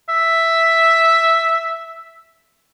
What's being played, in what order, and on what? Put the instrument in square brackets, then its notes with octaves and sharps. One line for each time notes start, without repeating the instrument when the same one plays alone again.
[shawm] E5